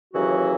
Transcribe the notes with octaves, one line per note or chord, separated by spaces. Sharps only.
D#2 C#3 E3 F#3 F#4